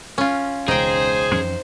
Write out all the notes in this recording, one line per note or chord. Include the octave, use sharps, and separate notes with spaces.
C#4 F4
E1 C#2 D#4 G#4 C5 G5
F2 E3 C#4